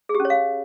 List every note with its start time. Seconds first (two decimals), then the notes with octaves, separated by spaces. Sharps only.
0.09 G#4
0.15 G4
0.20 C#4
0.25 C#5
0.30 F5